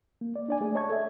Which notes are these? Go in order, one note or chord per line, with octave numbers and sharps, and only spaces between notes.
A#3
D5
D4 D5 G#5
A3 G#4 D5
C#5 D#5 A5 C#6 G#6
A4 E5